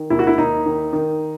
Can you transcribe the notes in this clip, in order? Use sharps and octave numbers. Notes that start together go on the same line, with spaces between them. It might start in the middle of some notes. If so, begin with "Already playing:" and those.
Already playing: D#3
D#2 E4
F#4
E4
D#2 D#4
D#3
D#3